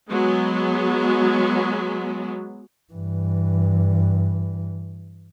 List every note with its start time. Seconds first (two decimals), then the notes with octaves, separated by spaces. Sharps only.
0.10 F#3 G#3 B3
2.94 G2 E3